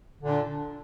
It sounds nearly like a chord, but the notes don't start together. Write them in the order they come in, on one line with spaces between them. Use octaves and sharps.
D3 A#2 D4